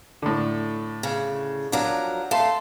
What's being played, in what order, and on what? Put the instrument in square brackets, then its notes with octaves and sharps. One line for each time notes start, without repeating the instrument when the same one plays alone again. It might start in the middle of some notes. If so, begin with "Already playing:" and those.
[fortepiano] A2 D3
[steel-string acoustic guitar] C#3
[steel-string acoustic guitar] F3 F#3 A#4 [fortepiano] D4
[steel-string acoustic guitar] A3 [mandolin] F5 A5 C6